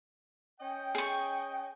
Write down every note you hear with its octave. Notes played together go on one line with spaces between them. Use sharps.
C#4 D#5 G5
G#4 C#6